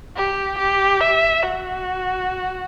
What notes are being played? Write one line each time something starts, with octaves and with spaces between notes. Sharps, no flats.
G4
G4
E5
F#4